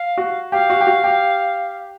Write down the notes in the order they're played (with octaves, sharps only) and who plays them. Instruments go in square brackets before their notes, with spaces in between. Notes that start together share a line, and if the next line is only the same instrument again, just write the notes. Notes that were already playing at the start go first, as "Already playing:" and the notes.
Already playing: [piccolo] F5
[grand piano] F#4
[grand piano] G4 [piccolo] F5
[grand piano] F#4
G4
F#4
G4